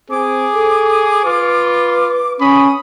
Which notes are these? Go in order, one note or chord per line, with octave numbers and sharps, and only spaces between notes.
C4 G#4 D6
A4
F4 B4
C#4 B5 D#6